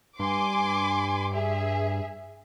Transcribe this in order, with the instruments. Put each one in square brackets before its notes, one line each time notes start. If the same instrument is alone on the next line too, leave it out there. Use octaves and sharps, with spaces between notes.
[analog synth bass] G2 [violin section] G#5 C6 D6
[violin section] G#4 E5